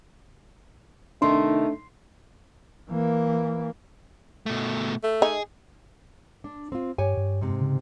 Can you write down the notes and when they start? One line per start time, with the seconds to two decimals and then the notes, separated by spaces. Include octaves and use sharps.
1.22 C3 D#3 A3 D4 D#4 C6
2.91 E3 A#3
4.46 B2 A3
5.04 A3
5.22 D#4 G#4
6.44 D4
6.72 C4 F4
6.98 G2 G4 C#5 G#5
7.17 G2
7.41 G#2 C3
7.61 C#3